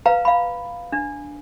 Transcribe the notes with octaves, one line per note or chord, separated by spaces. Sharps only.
B4 F5 A#5
F5 B5
D4